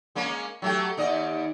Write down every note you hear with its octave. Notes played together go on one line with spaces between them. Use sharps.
G#3 A#3 C#4
F#3 A3 G4
D#2 D5 D#5